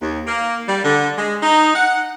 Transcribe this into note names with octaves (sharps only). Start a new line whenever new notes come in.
D#2
A#3
G3
D3
G#3
D#4
F#5